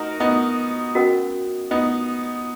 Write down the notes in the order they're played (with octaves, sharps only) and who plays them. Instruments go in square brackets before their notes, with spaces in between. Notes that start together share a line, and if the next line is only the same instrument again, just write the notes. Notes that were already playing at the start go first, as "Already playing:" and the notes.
Already playing: [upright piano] D#4 F#4 A#4
B3 D#4
[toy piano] C#4 F#4 A#4 D#5 F#5
[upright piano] B3 D#4